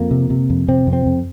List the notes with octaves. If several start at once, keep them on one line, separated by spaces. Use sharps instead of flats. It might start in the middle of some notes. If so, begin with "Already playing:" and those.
Already playing: F2 A#3
C3
C3
F2
C3 C4
F2
C4
F2